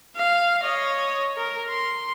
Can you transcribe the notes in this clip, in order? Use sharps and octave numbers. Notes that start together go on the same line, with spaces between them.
F5
C#5 D#5
A#4
C6